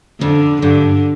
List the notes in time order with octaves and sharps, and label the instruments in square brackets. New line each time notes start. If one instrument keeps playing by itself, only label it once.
[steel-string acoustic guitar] F2 [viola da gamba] D3
[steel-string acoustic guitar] G2 [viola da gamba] D3